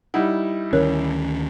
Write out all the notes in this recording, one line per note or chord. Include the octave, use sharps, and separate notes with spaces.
G3 D#4 E4 F#5
D2 D#3 C#4 A#4 C#5 F#6